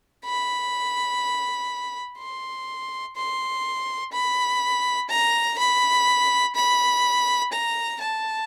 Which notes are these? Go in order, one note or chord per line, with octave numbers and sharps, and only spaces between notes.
B5
C6
C6
B5
A#5
B5
B5
A#5
A5